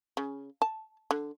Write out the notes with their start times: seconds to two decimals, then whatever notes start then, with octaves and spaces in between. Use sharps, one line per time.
0.17 C#3
0.62 A5
1.11 D3